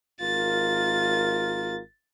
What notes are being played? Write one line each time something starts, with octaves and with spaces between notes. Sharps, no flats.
G#1 F4 A#4 A6